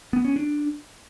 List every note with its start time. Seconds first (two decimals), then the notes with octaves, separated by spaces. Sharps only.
0.13 B3
0.25 C#4
0.36 D4